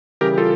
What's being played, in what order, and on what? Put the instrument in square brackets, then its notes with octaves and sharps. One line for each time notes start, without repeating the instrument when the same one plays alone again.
[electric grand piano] C#3 E3 G3 G4 A#4
F4 A4